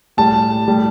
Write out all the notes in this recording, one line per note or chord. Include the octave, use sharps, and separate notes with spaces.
A2 G3 A5
A2 G3